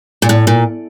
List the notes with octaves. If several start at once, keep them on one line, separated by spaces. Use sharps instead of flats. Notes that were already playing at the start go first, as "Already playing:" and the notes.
A#2
A2
A#2